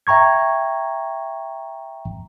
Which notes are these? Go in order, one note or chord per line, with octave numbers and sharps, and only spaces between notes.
E5 G5 A#5 C#6 G#6